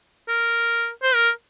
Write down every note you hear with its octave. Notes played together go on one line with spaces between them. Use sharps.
A#4
C5
A#4